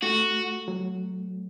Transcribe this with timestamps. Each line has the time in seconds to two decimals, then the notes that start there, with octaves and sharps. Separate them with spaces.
0.03 A3 F#4
0.68 F#3